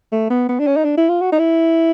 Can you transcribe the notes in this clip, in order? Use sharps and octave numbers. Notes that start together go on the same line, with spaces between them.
A3
B3
B3
D4
C#4
D#4
D4
E4
F4
F#4
D#4
E4